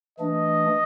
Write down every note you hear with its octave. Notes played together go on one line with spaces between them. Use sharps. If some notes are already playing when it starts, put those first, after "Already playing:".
E3 A3 D4 D#5